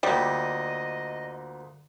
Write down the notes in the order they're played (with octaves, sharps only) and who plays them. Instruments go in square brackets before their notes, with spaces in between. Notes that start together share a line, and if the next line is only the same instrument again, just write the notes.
[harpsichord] D2 A#2 [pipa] G3 [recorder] D#5